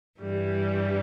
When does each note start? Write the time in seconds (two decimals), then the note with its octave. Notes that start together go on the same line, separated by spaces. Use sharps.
0.17 G2 E3 G3